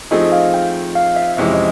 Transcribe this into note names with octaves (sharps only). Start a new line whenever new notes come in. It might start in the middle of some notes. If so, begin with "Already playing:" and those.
F3 A3 C4 D#4 G#4 D#5
F5
G5
F5
E5
F2 C3 E3 G#3 C#4 E5
D#5